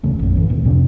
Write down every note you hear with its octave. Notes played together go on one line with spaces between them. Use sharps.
D#1 E2 C#3 A3
A#1 F#2
A2 E3
C#2 A#2
F2 C3 D4